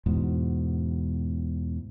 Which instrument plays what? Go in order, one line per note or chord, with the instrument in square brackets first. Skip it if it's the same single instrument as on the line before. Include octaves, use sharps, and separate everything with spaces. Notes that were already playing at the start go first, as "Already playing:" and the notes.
[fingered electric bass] E2 G#2 B2